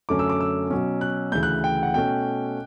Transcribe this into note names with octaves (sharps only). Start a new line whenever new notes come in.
F#2 D3 A3 C#4 D6
E6
D6
E6
B2 F#3 C#4
F#6
D2 C#3 E3 G6
F#6
G5
F#5
B2 A3 C#4 G5